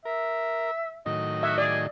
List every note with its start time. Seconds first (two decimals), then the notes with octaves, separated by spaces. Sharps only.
0.05 A#4 E5
1.06 A2 D#3 F#3 D#5
1.43 F#4 E5
1.58 G#4 D5